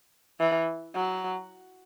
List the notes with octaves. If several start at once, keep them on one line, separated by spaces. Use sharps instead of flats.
E3
F#3